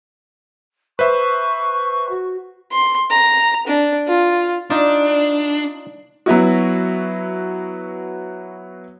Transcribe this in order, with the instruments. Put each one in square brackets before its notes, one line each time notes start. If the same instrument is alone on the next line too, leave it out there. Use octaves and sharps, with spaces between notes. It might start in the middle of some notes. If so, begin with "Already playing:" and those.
[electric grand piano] B4 C5 E5 [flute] C#6
[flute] F#4
[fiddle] C6
A#5
D4
F4
[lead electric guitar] D4 [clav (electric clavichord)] D#4 F4 [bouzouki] D5
[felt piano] F#3 B3 E4 F#4